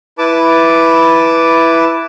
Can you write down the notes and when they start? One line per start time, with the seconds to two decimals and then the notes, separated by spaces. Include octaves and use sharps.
0.18 E4 B4 A5 D6